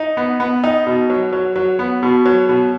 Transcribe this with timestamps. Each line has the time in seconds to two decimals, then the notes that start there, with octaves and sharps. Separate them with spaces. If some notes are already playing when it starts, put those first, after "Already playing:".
Already playing: D#4
0.17 B3
0.40 B3
0.64 D#4
0.87 B2
1.10 F#3
1.33 F#3
1.56 F#3
1.79 B3
2.03 B2
2.26 F#3
2.49 B2